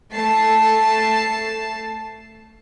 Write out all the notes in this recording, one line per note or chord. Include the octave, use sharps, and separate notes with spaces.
A3 A5 C7